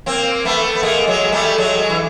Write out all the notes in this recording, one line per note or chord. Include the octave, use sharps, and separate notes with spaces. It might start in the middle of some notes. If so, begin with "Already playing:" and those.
A#3 C4
A3 B3
B3
G#3 A#3
F#3 G#3
G3 A3
F#3 G#3
E3